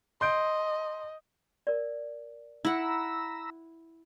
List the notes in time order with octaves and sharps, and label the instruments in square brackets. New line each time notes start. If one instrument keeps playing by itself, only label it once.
[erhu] D#5 [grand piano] C6 G6 D7
[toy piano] A#4 D5
[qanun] E4 F#5 [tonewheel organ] A#5 B5 E6